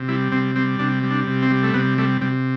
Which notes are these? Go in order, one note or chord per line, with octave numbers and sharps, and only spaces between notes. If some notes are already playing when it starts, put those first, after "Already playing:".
Already playing: C3
G3 E4
C3 C4
G3 C4
C3 D4
G3
D4
C3
C4
G3
A3
C3 B3
G3 A3
C3 G3